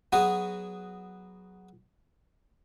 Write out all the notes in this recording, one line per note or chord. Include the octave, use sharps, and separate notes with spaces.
F#3 B3 F#4 G#4